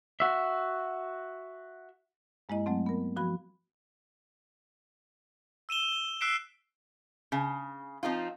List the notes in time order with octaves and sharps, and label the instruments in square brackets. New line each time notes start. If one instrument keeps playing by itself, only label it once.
[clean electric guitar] F#4 E5
[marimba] G2 G#3 A#3 E4 D#5
F#3 A3 C4
B3 A#4
F3 F#4 B5
[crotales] E6 D#7 E7 G7
E6 F#6 B6 C7 D7 E7
[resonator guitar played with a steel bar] C#3
F3 C4 D#4 F4